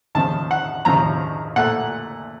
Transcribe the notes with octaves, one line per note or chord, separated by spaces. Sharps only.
D#2 C#3 F3 A5
F#5
D#2 C#3 F3 A#5
A#2 A3 F#5